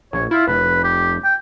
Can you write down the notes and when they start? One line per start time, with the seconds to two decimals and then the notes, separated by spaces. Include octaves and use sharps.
0.13 A#1 C#5
0.31 E4 F4
0.47 F1 B4
0.84 G4
1.24 G5